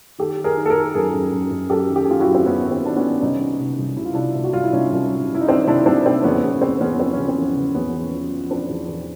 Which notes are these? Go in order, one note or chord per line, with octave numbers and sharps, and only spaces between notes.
D#3 G4 A4
D#3
G#4 A#4
D#3
A4
G#4 A#4
D#3
F#2 G#4 A#4
F#2
F#2
F#2
F#2 G4 A4
D#3
G4
G#4
D#3 F4 G4
E4 F#4
F#2
C4
F#2 B3 C#4
D#3
C4
D#3 D4
B3 C#4
D#3
C2 C#4 D#4
D#3
C3
C2
C3 E4
F4
C3 D4 E4
C3
F#4
C2 F4
E4
C2 C#4 D#4
C2
C2
C2
E4
D#4
D#3 C4 D4
C3 D4 E4
C2 C4 D4
C2 C4
E2 B3 C#4
E2 B3
E2 C4
E2 B3 C#4
F3 C4
C#4
C#3
C4
E2
C#3
E2 B3 C#4
E2
F3
F3
F3 C4 D4
E2
E2